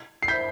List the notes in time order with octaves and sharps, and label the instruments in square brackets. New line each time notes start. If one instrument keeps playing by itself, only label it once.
[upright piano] C7
[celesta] C5 E5 B5 [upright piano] G6 B6